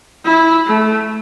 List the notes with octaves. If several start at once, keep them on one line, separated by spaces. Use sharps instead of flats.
E4
A3